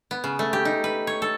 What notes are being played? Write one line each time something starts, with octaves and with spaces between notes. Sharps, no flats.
B3
C#3
A3
G4
D#4
B4
C#5
A4